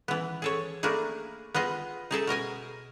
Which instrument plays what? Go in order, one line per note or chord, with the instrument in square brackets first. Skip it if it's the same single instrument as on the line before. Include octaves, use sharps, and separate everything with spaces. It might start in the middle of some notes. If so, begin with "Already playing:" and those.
[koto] E3 B3
G#4 A4 C#5
A3 A#3 D4 E4 G#4
B3 F4 G#4 D#5
D#4 G#4 A4 E5
B2 A#4 D#5 G#5